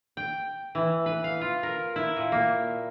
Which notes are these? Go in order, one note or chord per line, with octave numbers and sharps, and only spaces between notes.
G5
E3
B4
F5
F4
A#4
E4
A#2
A#3